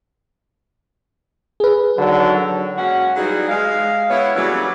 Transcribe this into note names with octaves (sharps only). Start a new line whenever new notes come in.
G#4 B4
D3 D#3 F#3
F#2 G#3 A#3 C#4 F#4 F#5
E3 F#3 G3 D#4 G#4
G#3 F5
B3 E4 C#5
C#3 E3 F#3 G3 A#3 C#4